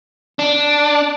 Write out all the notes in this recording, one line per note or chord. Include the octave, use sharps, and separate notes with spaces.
D4